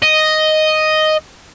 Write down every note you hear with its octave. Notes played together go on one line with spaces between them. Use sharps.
D#5